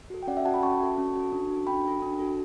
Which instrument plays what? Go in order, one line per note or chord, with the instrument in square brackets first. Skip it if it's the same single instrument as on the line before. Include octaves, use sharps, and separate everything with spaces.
[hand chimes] F#4 A4
G5
C#4 D5 F#5
E5 G5
F#4 F#5 A5
A4 G5 B5
C#4 A5 C#6
F#4 A4
C#4
F#4 A4
D4
F#4 A4
D4 G5 B5
F#4 A4
D4
F#4 A4